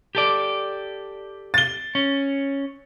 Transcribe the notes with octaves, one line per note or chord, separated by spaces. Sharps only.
G4 A4 D5
A6 G7
C#4